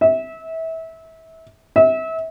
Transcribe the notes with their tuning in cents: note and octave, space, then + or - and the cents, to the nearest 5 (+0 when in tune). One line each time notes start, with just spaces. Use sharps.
E5 -25
E5 -30